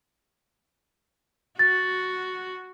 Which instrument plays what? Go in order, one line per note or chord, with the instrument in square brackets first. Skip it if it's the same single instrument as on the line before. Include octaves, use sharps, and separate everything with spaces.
[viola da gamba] F#4 [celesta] A6